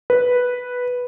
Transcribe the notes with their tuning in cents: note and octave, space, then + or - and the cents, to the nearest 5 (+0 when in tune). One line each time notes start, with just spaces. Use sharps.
B4 -5